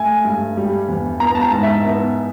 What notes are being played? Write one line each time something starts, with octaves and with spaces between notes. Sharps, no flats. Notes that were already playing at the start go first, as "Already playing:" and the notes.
Already playing: A3 G#5
G2
G3
E2
B3 A#5
A5
A#5
G#2
E5
B3